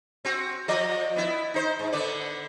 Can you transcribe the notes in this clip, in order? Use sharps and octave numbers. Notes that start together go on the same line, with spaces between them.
C4 F#4
F3 D5 D#5
B3 E4
D#4 C5
G#2
D3 B3 D5